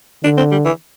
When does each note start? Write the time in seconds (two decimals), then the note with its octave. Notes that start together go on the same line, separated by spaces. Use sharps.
0.23 D3 D4
0.37 C4
0.51 G3
0.65 E3